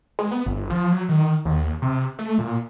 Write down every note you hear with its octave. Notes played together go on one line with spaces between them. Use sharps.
G#3
B3
G1
F3
F#3
D#3
D#2
C3
A3
A#2